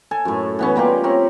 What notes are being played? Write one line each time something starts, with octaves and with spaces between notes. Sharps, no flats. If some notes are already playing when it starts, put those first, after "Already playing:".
A4 G#5
F#2 A2
E3 B3 C#4
G3 A#3 F4 G4
C4 A#4 C#5